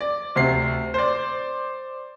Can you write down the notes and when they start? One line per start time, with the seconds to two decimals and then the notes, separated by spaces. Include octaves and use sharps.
0.01 D5
0.35 D2 C3 C7
0.94 C5 D5